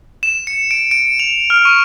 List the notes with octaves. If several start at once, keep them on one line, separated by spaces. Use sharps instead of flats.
E7
C#7
D7
D7
F7
F6
C#6